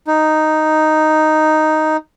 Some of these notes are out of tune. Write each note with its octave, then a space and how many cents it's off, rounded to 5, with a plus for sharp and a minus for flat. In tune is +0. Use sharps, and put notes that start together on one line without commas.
D#4 -5